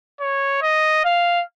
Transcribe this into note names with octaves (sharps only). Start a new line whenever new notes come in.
C#5
D#5
F5